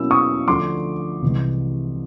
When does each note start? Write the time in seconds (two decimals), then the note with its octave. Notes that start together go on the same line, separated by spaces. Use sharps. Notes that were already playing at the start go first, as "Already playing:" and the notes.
Already playing: B2 F#3 A#3 C#4 E4 E6
0.11 C#6 D#6
0.48 D2 D3 F3 C6 D6
1.22 C2 C3 E3 G#3